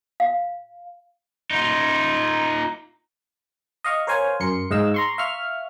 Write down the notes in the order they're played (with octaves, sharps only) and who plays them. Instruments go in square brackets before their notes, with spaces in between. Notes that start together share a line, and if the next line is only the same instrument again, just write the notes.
[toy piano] F5
[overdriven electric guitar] D#4 F4
[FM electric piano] D#5 F5 C#6
A#4 C5 C#5 F5 G#5
F#2 A#4 C6 C#7
G#2 D#5 F5 E6
A#5 C6 C#6
E5 F5 C#6 F6